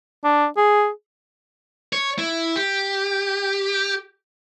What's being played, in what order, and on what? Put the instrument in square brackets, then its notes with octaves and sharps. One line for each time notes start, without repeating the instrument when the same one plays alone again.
[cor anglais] D4
G#4
[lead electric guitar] C#5
E4
G4